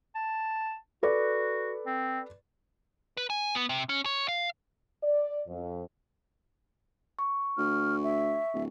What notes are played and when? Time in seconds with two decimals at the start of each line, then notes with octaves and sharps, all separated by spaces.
0.15 A5
1.03 F#4 A4 B4 D5
1.86 C4
3.17 B4
3.30 G#5
3.55 B3
3.69 C3
3.89 C#4
4.06 C#5
4.28 F5
5.02 D5
5.47 F2
7.19 C#6
7.58 D2 F6
8.04 E5
8.54 D1